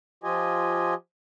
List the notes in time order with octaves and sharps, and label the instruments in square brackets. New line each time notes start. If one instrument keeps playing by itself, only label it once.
[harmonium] F3 F4 G4 D#5 G#5